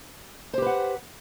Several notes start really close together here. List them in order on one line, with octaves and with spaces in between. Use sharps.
C5 G4 B4 F#5